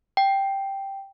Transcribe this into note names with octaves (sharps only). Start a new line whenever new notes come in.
G5